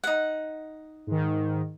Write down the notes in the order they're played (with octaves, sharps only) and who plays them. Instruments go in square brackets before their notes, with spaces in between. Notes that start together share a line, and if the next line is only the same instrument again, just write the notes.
[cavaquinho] D#4 F#5
[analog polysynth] G#2 D#3